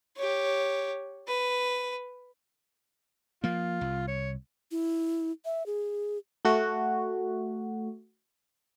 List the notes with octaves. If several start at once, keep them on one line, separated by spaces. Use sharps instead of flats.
G4 C#5
B4
F3 A#3 F4
C2
C#5
E4
E5
G#4
A3 F#4